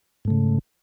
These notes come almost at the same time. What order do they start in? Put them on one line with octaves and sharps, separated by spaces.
G#2 A3 C#3